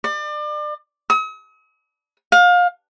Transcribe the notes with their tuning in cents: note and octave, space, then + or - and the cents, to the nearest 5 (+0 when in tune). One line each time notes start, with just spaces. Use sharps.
D5 +35
D#6 +45
F5 +30